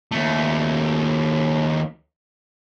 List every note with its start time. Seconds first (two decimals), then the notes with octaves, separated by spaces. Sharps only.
0.12 D#2 A3